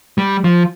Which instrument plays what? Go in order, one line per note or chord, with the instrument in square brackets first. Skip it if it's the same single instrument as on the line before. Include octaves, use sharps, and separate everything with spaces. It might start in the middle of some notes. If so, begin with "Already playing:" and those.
[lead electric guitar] G3
F3